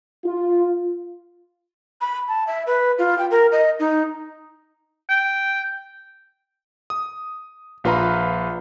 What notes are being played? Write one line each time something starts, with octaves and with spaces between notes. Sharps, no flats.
F4
B5
A5
E5
B4
F4
G5
A#4
D#5
D#4
G5
D#6
A#1 F4 B4 F5 A#5 B5